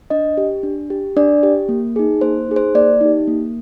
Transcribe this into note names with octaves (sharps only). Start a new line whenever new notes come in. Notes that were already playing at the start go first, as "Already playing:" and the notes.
D4 D#5
G4
D4
G4
D4 D5
G4
A#3
D#4 G#4
A#3 C5
D#4 G#4
C5
A#3 D5
D#4 G4
A#3